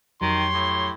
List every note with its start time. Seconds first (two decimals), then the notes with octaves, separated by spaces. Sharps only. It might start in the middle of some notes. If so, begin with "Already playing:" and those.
0.21 F2 D#3 F#3 G4 C#5 C6
0.54 A2